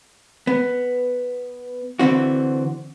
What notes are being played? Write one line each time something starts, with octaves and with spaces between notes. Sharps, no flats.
B3
D3 E3 C4 F#4